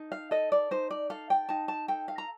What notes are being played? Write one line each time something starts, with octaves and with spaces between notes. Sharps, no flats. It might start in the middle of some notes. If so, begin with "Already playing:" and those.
Already playing: D#4 A4
F5
A4 D#5
D5
D#4 C5
D5
A4 F5
G5
D#4 A5
A5
A4 G5
F5
A#5